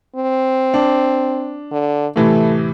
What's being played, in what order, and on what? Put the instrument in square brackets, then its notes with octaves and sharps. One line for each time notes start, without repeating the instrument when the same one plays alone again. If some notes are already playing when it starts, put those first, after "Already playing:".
[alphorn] C4
[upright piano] D4
[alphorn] D3
[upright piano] A2 C3 E3 [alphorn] A3